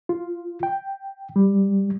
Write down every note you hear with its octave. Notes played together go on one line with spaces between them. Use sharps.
F4
G5
G3